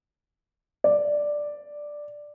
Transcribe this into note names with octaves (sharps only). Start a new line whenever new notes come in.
D5